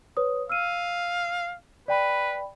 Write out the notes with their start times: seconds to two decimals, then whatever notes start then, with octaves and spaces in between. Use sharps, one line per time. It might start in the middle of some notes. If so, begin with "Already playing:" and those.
0.17 B4 C#5 D#6
0.50 F5 E6 F6 D#7
1.88 B4 D5 G5 B5